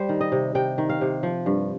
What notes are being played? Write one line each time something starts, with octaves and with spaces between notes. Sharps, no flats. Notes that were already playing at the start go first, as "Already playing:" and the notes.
Already playing: G3 C5
D#3
D#5
C3
C3 G5
D#3
F5
C3
F3
G2